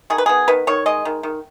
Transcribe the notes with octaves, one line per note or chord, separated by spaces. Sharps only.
D#3 G#4
B4
B3 G#4
D#3 B4
D#3 C#5
G#3 D#5
D#3
D#3